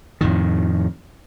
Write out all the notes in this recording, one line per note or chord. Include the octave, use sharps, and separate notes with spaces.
F2 A2 D#3